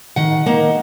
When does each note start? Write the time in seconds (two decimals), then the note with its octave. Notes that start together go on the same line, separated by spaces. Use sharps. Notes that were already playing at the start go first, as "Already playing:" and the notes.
0.16 D#3 F#5
0.46 A#3 D#4